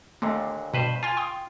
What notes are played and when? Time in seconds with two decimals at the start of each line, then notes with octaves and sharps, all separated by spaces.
0.22 D#2 A#2 D3 A3
0.74 G2 B2 B4 C5
1.03 F4 G#5 C6 G#6
1.17 G5 C6 D#6